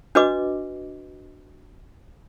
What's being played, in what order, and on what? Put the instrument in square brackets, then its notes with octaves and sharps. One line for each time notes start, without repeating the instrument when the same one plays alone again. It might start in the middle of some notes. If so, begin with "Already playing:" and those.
[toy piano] D4 F#4 B4 D#5 D6